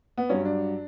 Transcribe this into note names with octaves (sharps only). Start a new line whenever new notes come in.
B3
G2 F#3 C#4
D4